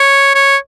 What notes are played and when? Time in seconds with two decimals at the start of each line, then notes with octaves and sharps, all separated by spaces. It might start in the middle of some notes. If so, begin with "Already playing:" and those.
Already playing: C#5
0.35 C#5